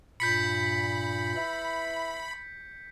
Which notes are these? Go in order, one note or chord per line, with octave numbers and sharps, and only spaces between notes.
G2 A#2 B5 G6 B6 C#7
E4 B4 E5